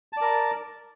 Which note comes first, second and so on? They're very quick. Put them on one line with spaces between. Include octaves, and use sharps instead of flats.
A5 D5 A#4